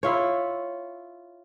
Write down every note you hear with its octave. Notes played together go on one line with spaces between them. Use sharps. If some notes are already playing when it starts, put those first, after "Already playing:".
E4 F4 C#5